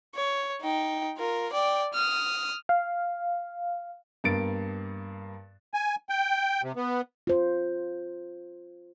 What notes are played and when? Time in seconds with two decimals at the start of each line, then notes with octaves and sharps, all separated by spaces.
0.15 C#5
0.61 D#4 G5
1.17 F4 A#4
1.53 D5 G5
1.93 D#6 F6
2.69 F5
4.24 G2 A#3 B3 A6 D7
5.74 G#5
6.09 G5
6.63 C3
6.76 B3
7.27 F4 C5